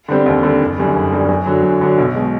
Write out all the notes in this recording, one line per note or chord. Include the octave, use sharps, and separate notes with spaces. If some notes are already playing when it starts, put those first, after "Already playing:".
D3 G3 C4
D#2
D3 G3 C4
F#1
F#2 D3 G3
F#1
F#2 D3 G3
F#2
D3 F#3
F#2
D3 F#3
B1
B2 G#3